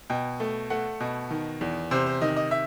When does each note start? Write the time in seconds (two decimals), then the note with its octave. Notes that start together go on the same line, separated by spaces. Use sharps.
0.10 B2 G5
0.40 A3
0.70 A3 F#5
1.00 B2
1.31 D#3
1.61 E2
1.91 C3 C5
2.06 C5
2.21 D#3 D#5
2.36 D#5
2.51 E5